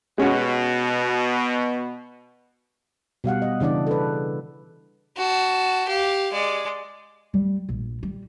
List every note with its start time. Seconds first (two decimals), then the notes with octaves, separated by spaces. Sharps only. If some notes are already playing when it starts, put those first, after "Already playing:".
0.18 B2 G#3 C#4 F#4
3.24 B2 G3 F5 F#5
3.42 D#5
3.60 C#3 E3 D4 D5
3.87 A4 B4
5.17 F#4 A5
5.88 G4 F5
6.33 G#3 D5
7.34 G3
7.69 A#1
8.03 G3